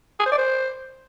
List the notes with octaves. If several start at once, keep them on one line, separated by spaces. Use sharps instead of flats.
G#4
C5
D5
C5